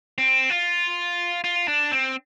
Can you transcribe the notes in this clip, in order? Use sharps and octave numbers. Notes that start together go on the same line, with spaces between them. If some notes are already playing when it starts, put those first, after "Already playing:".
C4
F4
F4
D4
C4